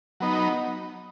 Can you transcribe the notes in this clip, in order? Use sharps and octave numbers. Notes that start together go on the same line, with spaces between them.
F#3 B3 D#4